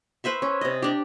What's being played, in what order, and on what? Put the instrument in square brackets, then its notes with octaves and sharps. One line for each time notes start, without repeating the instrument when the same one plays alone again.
[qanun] B4 C5 E5 C#6
C#4
C3 D#5
D4 G4